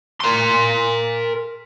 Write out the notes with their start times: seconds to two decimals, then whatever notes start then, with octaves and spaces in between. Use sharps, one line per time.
0.20 A#4 C6